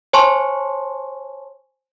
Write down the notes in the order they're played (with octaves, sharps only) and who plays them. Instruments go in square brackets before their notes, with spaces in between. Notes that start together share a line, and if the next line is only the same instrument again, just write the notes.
[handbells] C5 C#5 G#5 A5 C6 C#6